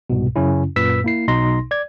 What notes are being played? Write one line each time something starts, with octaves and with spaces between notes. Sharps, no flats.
C2 G#2 B2
F#2 C#3 C#4 E4
F#2 A#2 B4 E6 B6
A#3 E4 C7
B1 B2 D#4 C6 A#6
D5 G#6